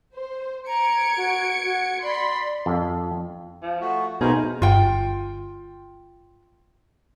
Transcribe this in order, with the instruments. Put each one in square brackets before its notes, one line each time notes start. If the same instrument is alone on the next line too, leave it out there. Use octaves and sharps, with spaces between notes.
[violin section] C5
[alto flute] A#5 [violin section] G#6 C#7 D7
[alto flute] F#4
F#4
[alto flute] D5 [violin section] B5 C6
[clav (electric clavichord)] F2
[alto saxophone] F3
[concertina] A3 F#4
[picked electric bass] B2 [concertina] A3 A#4 C5 [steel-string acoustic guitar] D#4 [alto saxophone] G#4
[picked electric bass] G1 [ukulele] F4 G5